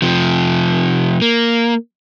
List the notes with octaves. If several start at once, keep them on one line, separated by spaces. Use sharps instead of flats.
C3 F3
A#3